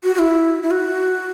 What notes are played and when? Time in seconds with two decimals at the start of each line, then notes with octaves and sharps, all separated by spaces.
0.04 F#4
0.15 F#4
0.19 E4
0.63 E4
0.71 F#4